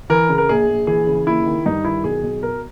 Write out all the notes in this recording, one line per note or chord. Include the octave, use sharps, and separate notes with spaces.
E3 A#4
C#3
A#4
A#1 G#4
A#1
E3 G#4
C#3
D#2 E4
D#3
G2 D#4
D#3 E4
B1 G#4
B1
B2 A#4